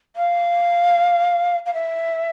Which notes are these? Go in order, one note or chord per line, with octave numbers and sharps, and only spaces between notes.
F5
F5
E5